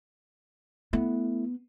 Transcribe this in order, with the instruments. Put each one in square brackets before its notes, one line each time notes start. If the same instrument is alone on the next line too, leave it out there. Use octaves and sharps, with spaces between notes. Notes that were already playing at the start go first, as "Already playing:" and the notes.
[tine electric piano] A3 E4 [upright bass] B3